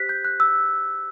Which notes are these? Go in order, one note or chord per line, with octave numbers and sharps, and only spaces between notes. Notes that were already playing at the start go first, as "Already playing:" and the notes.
Already playing: G4 C5 F#6 B6
G6
F#6
E6